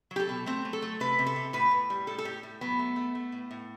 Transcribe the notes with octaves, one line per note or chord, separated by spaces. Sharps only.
F#3
G4
A4
B2
A3 C4
F#3
A4
A3
C3 B4
C3
A4
C3
A2 B4
A2
G3
A2 A4
A4
A2 G4
A2
F#3 B3
A3
A3
A3
A2
A2